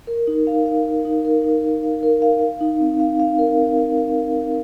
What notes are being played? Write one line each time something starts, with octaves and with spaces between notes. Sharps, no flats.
A#4
D#4
F5
F5
F5
D#4
A#4
D#4
A#4
F5
A#4
F5
F5
D#4
C4
F5
F5
A#4
C4
F5
F5